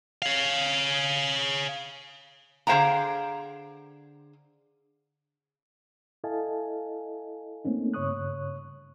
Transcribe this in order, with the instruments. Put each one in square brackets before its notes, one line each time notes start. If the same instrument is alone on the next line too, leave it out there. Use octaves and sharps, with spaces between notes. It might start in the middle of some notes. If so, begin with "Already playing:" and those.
[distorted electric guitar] C#5 F5
[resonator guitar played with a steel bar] D3 G#4 C5 F5 G5 A#5
[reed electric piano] E4 A4 D#5 F5 G#5 A5
A3 A#3 C4 C#4 D#4
G2 C#3 C#5 C#6 D#6 F#6